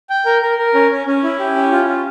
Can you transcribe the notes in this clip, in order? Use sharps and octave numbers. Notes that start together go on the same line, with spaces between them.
G5
A#4
A#4
A#4
C#4
C#4
C#4
E4
G4
C#4
F4
F4